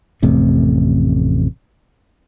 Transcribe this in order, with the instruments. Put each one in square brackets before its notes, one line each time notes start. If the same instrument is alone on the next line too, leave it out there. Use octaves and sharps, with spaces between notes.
[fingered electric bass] A1 F2 C3 A3